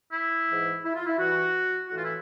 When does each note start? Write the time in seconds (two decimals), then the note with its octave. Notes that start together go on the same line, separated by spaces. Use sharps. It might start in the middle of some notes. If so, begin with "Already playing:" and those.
0.12 E4
0.47 G#2 E3
0.83 E4
0.94 F4
1.06 E4
1.17 G2 E3 F#4
1.88 A2 E3 F#4
1.96 F4
2.04 E4